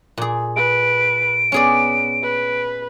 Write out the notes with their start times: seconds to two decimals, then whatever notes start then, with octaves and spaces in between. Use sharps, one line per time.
0.18 A#2 G#4
0.56 B4 D7
1.52 B3 C#4 G#4 D5
2.23 B4